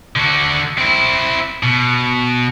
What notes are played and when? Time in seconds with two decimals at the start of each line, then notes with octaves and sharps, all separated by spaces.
0.16 D3 F#4
0.78 C4 E4
1.63 B2